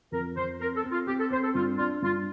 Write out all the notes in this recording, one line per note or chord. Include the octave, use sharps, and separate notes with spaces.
F2 A#4
F2 C5
C4 A#4
A4
C4
F4
C4 G4
A4
C4 C5
A4
G2 F4
D4 F4
G2 F4